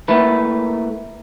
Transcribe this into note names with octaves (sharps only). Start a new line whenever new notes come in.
A3 A#3 E4 A4 B4